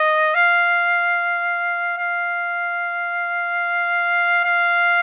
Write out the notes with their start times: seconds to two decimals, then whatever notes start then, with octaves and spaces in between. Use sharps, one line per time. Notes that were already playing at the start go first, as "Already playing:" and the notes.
Already playing: D#5
0.34 F5
1.97 F5
4.44 F5